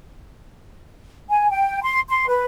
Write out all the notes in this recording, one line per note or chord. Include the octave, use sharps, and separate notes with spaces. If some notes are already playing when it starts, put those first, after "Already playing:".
G#5
G5
C6
C6
B4